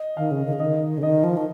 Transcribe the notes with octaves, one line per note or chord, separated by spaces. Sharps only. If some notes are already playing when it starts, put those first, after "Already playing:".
Already playing: D#5
D#3 F5
C#3
D#3
C#3
D#3 D#5
C#3
D#3 D#5
F3
D#3